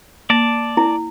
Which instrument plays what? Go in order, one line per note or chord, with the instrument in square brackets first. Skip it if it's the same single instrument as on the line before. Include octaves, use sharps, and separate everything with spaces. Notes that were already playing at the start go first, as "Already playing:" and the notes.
[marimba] A#3 [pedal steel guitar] D5 A5
[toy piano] E4